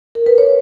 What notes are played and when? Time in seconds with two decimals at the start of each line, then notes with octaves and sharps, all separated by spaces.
0.15 A#4
0.26 B4
0.38 C#5